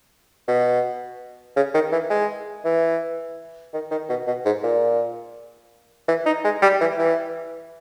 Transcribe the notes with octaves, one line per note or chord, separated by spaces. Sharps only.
B2
C#3
D#3
E3
G#3
E3
D#3
D#3
B2
B2
G#2
A#2
E3
D#4
G#3
G3
E3
E3